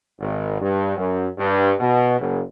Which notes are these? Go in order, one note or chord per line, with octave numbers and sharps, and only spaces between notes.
G#1
G2
F#2
G2
B2
F#1